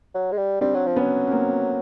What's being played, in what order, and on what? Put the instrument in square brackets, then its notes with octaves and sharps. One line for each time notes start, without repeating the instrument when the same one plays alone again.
[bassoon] F#3
G#3
G3
[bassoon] G3 [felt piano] C4 D4
[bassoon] F#3
F3
[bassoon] F#3 [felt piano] B3 C#4
[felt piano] C#4
A#3 C4